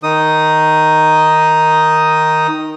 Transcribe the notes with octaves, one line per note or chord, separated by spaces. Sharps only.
D#3 D#4 D#6